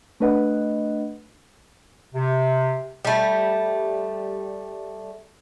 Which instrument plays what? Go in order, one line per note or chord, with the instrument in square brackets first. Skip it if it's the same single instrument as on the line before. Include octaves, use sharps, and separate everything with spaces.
[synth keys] A3 D4 B4 D#5 F#5
[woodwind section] C3
[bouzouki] G3 A3